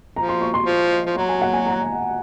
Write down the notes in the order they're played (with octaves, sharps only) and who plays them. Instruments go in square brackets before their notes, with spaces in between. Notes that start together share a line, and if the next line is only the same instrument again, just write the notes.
[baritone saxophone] F3 [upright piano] A#5
[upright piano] C6
C#6
C6
[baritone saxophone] F3
F3
[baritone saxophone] F#3 [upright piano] A#5
[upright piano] G#5
F#5
G#5
A#5